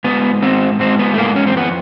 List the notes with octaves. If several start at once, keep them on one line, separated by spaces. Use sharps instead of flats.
G#2 B3
G#2 C4
G#2 C4
B3
A3
G#2 A#3
C#4
C4
F2 B3